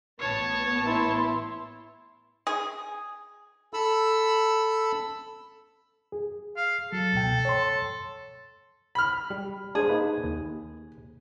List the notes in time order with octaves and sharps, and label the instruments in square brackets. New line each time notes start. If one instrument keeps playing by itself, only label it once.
[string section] A1 B3 [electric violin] C#5 A5
[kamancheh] E4 C6
[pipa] G#4
[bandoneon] A4 B5 E6
[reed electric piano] G#4
[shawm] F5
[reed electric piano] F#3 [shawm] A4
[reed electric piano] C#2 B2 G5
C#5 C6
[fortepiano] B5 F6
[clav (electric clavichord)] G3
[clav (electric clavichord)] D4 C5 [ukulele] G#4
[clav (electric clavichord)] A#3 D#4 B4
D#2